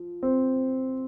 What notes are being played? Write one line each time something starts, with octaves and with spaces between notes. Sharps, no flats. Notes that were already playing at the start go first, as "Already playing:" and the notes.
Already playing: F3
C4